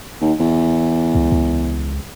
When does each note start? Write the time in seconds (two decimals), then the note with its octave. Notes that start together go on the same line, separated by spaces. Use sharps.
0.21 D#2
0.39 E2
1.15 C#2
1.32 C#2